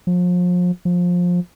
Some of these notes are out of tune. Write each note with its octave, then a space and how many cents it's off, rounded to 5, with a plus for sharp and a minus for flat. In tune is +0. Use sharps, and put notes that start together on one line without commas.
F3 +35
F3 +20